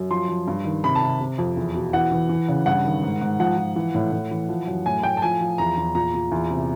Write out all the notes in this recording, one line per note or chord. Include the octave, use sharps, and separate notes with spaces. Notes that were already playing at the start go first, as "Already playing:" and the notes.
Already playing: F#2
F3 C6
F3
G2
D#3
C3 B5
A5
C3
C3
F2
E2
B2
E3 F#5
E3
E3
C#3
G2 F#5
D#3
G#2
G#2
F3 F#5
F3
E3
A2
A2
E3
F3
F#2
A2 G#5
A2 G5
A5
F3 G#5
F3
E2 A#5
E2
A#2 A#5
A#2
E2
C3